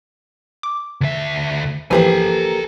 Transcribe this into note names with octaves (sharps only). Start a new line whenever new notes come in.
D6
D2 E5
E3 F3 A#3 G4 A4 B4 G#5